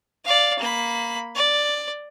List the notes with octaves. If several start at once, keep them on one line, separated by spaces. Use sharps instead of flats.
D5 F5
A#3 B5
D5